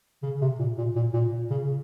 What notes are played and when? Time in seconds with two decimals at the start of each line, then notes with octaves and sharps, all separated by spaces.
0.23 C#3
0.41 C3
0.59 A#2
0.78 A#2
0.96 A#2
1.13 A#2
1.50 C#3